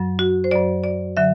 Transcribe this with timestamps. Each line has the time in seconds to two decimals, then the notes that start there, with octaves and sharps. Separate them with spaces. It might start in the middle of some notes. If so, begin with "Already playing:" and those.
Already playing: F#2 F#3
0.19 F#4
0.44 C5
0.51 F#2 F#3 D5
0.84 D5
1.17 D3 F#3 E5